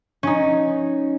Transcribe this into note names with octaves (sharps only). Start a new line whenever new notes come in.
C#4 D#4